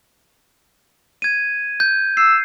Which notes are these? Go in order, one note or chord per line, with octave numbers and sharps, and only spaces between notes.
G#6 D#7
G6
E6 C7